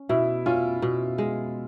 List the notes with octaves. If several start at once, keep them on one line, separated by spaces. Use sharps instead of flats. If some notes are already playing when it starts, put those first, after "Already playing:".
Already playing: C#4
B2 E4
C#4 F4
B2
G#3